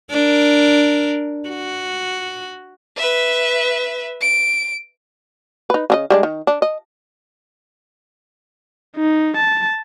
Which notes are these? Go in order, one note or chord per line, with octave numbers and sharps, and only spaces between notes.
D4 A#4
F#4
B4 E5
D7
D#4 B4
C#3 D4 D#5
G3 G#3 D4
D#3
D4
D#5
D#4
A5